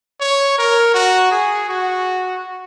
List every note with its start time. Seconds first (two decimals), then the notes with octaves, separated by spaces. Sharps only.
0.21 C#5
0.58 A#4
0.94 F#4
1.31 G#4
1.69 F#4